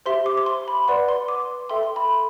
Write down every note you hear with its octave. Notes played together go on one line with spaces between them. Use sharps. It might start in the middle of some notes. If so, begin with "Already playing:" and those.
G4 C5 E5 C6
D6
D6
C6
B5
B4 D5 F#5 C6
C6
D6
A4 E5 G5 C6
C6
B5